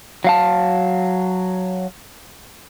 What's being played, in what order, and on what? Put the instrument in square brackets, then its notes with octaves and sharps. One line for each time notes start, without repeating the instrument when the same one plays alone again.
[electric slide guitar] F#3 F5 A5